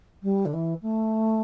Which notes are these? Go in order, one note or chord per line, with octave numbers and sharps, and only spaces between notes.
G3
D3
E3
A3